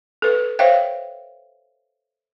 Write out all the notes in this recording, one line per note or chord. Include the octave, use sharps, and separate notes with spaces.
A4 B4
C5 C#5 E5 F5 G5